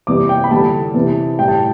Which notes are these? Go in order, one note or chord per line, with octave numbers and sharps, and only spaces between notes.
E2 C3 G3 D6
G5
B5
E2 D3 G3 A5
E2 C3 E3
A2 G3 G5
A5